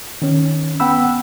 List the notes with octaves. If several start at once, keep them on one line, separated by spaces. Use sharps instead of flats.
D#3 C#4
B3 F#5 G5 B5 E6